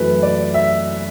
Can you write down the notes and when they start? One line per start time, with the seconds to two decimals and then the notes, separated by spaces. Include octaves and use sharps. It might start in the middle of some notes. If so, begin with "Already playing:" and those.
Already playing: F#2 E3 A3 B4
0.23 D5
0.54 E5